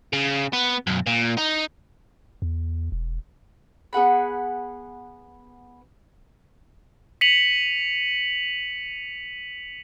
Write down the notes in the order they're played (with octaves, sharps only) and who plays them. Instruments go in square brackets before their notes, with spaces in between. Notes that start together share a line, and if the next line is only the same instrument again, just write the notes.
[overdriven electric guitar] C#3
B3
B1 F#2
A#2
D#4
[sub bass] E2
E1
[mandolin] B3 G#4 F#5 B5
[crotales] B6 C#7 D#7 F7 F#7